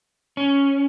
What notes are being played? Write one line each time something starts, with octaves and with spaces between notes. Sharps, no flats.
C#4